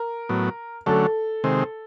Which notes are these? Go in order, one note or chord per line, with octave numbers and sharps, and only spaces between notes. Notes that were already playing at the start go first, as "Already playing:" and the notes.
Already playing: A#4
A2 F#3 B3
D3 F#3 A3 C#4 A4
C3 D#3 G#3 C4